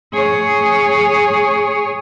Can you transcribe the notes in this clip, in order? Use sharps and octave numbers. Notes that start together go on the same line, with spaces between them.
G#4 C#5